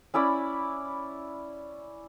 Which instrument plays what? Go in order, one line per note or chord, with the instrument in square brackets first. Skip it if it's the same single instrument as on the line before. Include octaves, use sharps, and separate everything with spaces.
[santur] C#4 E4 D5 B5